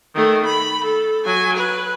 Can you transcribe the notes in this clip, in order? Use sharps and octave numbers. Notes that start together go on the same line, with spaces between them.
D#3 A3
B5
A4
F#3 G#5
B4